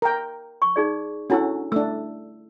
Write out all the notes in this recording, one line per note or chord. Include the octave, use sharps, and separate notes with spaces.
A#4 G5
C#6
D#4 G#4 D5
C#4 D4 E4 F#4 A4 E6
A3 D4 E6